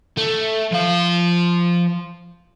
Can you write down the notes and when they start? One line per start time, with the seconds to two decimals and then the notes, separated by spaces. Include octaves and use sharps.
0.17 A3
0.72 F3 F5